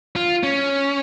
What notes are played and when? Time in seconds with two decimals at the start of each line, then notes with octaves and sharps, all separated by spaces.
0.16 F4
0.43 C#4